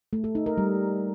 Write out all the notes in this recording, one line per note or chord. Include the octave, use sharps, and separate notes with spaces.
A3
A4
D#4
A#4
G3